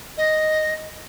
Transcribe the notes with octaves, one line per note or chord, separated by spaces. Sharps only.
D#5